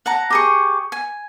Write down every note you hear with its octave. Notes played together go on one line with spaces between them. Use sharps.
F#5 A5 A#5
G4 G#4 C#6
G#5